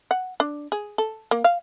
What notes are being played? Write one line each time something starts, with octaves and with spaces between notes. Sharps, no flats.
F#5
D4
G#4
A4
A#3
F5